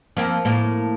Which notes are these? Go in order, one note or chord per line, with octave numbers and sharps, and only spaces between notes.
F3 A#3 C4
A2 A#3